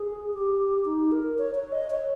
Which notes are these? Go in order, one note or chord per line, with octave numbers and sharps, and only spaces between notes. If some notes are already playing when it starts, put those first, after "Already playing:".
Already playing: G#4
G4
D#4
A#4
C#5
C#5
D#5
C#5